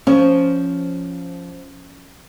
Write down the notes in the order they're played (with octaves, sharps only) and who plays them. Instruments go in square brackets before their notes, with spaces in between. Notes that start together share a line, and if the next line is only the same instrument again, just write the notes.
[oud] F3 [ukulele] C#4